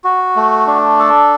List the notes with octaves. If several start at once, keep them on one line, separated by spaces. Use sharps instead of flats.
F#4
A3
D4
A4